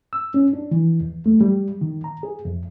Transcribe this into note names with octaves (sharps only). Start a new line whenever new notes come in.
E6
C#4
D4
E3
E2
A3
G3
D#3
A#5
G#4
F2